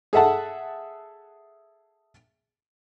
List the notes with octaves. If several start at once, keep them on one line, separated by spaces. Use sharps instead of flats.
G#4 A4 E5 F#5 A5